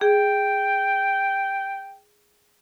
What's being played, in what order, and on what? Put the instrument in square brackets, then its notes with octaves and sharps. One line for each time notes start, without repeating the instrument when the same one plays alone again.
[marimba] G#4 [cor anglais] G5